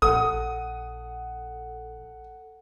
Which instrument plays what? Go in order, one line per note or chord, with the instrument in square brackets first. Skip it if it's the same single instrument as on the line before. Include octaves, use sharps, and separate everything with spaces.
[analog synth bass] A#1 [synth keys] A4 F#5 [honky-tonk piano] D#6